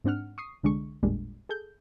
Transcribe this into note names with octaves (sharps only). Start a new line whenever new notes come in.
G#2 C4 D4 F#5 F6
C#6 D#6 C7
C2 D3 G#3 D4 C#6
A1 E2 A#2 G3 G#3 D4
G#4 A4 G6